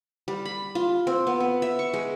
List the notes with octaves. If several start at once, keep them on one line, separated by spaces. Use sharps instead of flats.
G3
B5
F4
C4
B3
B3
E5
C#6
G#3